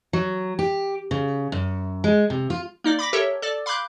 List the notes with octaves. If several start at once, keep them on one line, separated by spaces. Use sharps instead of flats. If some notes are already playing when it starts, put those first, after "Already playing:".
F#3
G4
C#3
F#2
G#3
C3
F4
A#3 D#4 D5
B5 D6 A#6 B6
G4 A4 A#4 C#5 E5
A4 D5
F5 B5 C6 D6 F#6 G6